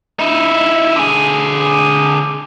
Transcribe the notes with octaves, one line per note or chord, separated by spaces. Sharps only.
D#4 E4
D3 G#4